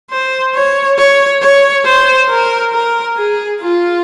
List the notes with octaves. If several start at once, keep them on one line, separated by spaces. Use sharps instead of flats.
C5
C#5
C#5
C#5
C5
A#4
A#4
G#4
F4